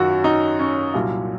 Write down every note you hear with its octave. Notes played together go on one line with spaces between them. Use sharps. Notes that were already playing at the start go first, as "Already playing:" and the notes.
Already playing: F#2 D#3 F#3 F4 F#4
D#4
C#4
C2 A#2 F#3